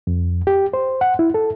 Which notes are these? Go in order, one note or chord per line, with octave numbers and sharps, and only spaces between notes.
F2
G4
C5
F#5
E4
A4